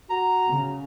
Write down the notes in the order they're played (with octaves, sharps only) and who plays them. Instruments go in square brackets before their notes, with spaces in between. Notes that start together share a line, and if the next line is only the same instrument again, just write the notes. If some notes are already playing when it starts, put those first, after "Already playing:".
[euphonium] F#4 [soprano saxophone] A#5
[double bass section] C#3